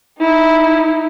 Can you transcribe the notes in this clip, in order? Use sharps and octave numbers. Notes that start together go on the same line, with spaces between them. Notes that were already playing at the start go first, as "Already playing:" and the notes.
D#4 E4